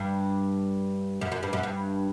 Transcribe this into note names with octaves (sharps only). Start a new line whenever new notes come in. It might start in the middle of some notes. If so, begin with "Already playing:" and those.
Already playing: G2
F#2
F#2
G2
F#2
G2